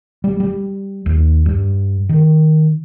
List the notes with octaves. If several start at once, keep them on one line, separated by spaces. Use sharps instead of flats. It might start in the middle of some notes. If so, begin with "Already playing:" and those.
G3
G3
D#2
G2
D#3